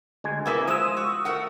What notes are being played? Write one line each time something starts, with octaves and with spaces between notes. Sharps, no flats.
D2 G#3 G#5
C3 A#3 B3 E4 G#4 E5
F3 G#3 C5 D#6 E6
F#4
A3 A#4 F#5